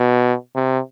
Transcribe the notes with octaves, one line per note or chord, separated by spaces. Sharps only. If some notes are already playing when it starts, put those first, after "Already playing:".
Already playing: B2
C3